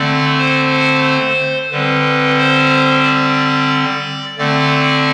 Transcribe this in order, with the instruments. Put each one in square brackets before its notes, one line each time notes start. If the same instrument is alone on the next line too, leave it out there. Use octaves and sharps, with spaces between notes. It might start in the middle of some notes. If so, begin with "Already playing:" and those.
Already playing: [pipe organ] D3 A3 C4 D5
C5
D3 G3 C4 B4
C5
D5
D3 A3 C4 D5